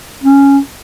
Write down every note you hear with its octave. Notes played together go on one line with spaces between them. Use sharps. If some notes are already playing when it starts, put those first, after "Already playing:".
C#4